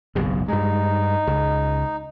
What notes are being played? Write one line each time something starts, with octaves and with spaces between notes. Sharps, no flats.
F#1 B1 G#2
G2 G#3 D#4
C#2